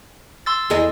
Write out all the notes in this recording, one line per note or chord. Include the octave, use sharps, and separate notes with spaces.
C6 E6 A6
E2 G#4 D#5